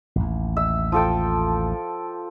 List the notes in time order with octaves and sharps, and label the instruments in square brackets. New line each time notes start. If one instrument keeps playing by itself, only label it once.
[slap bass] A1 D#2
[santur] E5
F3 A4 G5